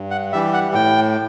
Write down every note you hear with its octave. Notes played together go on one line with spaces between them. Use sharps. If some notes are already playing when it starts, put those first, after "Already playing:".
Already playing: G2
F#5
E3 G3 E5
F#5
A2 G5